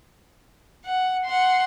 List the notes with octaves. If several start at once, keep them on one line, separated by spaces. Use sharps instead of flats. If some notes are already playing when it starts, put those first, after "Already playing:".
F#5
F#5 C6